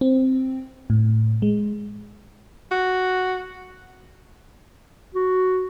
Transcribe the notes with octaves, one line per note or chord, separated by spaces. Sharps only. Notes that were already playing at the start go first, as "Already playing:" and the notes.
C4
A2
G#3
F#4
F#4